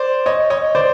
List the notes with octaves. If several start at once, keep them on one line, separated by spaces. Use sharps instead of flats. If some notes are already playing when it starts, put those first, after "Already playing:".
Already playing: C5 D5
C#5 D#5
C#5 D#5
C5 D5